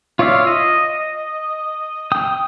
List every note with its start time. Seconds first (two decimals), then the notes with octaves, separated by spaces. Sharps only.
0.19 F4 C#5 D5 E5 F5
0.47 D#5
2.12 G5 D#6